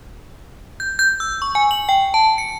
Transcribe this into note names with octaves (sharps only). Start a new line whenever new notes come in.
G6
G6
E6
C#6
G#5
F#7
G5
A5
C#7